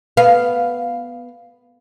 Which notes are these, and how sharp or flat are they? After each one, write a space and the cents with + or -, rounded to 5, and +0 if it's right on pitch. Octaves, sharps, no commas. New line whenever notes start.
B3 +0 F5 +0